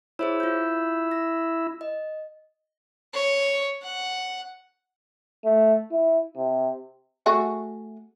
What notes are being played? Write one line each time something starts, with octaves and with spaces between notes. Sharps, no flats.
E4 G#4 C5 C#5
F4 G6
A#6
D#5
C#5
F#5
A3
E4
C3
A3 F#4 G#4